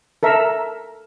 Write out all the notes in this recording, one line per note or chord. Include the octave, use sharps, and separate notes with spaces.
A4 A#4 E5